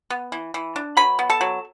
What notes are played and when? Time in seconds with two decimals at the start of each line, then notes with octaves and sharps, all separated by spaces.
0.10 B3
0.32 E3
0.54 E3
0.76 D4
0.97 F#3 B4 B5
1.19 B3
1.30 A4 A5
1.41 F#3